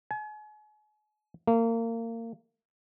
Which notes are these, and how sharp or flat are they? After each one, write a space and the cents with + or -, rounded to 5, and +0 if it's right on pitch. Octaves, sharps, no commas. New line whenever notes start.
G#5 +40
A#3 -30